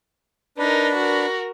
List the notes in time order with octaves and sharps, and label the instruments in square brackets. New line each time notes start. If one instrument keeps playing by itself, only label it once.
[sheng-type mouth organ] D4 B4 [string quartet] D#4 A#4
[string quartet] F#4 A#4